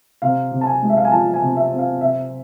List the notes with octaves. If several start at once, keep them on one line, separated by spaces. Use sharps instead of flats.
C3 F5
C3
A5
G#5
G#3
E5
F5
G#5
F3 A5
G#5
C3
E5
C4
F5
C3 E5